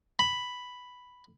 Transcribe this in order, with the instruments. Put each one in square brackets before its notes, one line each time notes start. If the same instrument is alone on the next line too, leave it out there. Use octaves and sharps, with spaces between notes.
[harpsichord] B5